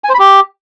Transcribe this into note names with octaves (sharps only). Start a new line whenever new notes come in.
G#5
C5
B5
G4